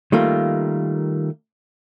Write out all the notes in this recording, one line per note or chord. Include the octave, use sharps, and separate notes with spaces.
D#3 G3 A3 A#3 F4